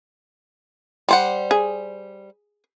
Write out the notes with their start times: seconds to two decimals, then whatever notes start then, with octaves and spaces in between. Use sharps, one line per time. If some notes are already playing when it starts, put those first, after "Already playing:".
1.09 G3 C5 F#5
1.51 G#4